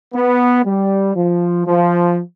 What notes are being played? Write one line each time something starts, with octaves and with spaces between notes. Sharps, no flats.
B3
G3
F3
F3